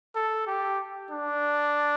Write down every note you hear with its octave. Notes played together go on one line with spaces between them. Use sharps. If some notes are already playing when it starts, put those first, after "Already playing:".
A4
G4
D4